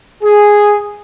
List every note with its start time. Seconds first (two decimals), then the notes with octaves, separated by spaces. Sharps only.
0.23 G#4